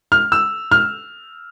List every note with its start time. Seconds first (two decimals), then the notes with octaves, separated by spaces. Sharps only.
0.12 F6
0.32 E6
0.71 F6